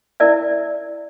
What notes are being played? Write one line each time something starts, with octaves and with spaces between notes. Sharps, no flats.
C#4 E4 A#4 D5 E5